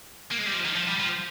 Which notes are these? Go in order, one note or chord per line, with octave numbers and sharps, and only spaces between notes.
A#3
G#3
G3
F3
D#3
F3
G3
F3